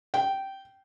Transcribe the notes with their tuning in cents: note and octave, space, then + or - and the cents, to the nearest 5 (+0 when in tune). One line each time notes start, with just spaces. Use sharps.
G5 -15